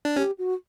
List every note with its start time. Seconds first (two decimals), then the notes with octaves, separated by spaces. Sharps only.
0.05 D4
0.16 C#4 G4
0.38 F#4